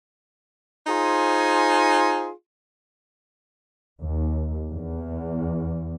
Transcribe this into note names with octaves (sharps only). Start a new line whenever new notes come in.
D#4 F4 G#4 C5 G#5
D#2
E2